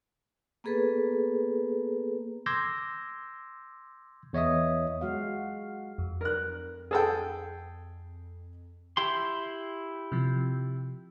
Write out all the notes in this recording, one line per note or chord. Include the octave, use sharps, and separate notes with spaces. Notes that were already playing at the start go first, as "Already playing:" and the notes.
A#3 B3 G#4 A4 B4
C6 D6 E6 G6 G#6 A#6
E2 C#5 D#5 E5 D#6
G#3 F#4 F5
F2
A#4 F#6
G#4 A4 G5
E4 G4 C6
C3 F3